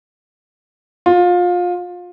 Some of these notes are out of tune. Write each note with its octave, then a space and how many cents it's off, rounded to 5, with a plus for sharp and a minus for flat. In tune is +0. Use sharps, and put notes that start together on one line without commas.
F4 +25